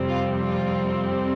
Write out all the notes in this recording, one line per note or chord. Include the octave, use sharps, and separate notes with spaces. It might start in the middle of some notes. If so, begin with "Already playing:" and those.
Already playing: F2 C3 G3 C4
F4
F4